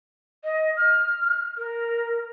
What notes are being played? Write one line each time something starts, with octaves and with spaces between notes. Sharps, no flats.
D#5
F6
A#4